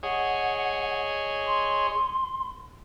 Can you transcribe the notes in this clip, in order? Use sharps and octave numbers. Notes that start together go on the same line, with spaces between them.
G#4 C#5 D#5 F#5
C6